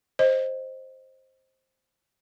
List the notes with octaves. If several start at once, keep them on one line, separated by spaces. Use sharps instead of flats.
C5 D#5